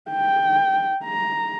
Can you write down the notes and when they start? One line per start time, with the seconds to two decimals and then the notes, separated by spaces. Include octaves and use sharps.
0.10 G5
1.04 A#5